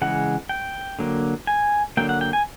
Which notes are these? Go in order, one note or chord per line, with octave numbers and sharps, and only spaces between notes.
C#3 E3 G#3 F#5
G5
D3 F#3 A#3
G#5
D3 F#3 A#3 G5
F#5
G5
G#5